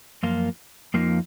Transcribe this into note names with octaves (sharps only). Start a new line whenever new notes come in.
F#2 F3 A#3 F4
F2 F3 A#3 D#4